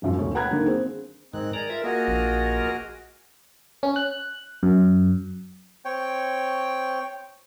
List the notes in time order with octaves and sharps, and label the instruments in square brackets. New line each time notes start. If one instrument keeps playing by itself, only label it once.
[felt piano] E1 F#2 F3
E1 D2 C#5
F#5 G5 A#5 B5 F#6 G#6
D3 D#3 A#3
C4 G#4
[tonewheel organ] G#2 D#3 G#3 [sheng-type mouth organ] C4 D#4 F#6
[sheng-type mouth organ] G#4 [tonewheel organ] A#4 D5 A#5
[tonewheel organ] F4 A#4 E5
[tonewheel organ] A#3 F4 A#4 [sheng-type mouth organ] F#4 G#4 D#5
[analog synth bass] A#1
[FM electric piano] C#4
F#6
F#2
[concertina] C4 C#5 G5